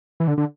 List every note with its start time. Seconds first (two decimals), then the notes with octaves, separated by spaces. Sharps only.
0.20 E3
0.27 D3
0.38 D3